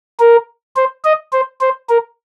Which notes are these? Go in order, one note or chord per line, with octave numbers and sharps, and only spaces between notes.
A#4
C5
D#5
C5
C5
A#4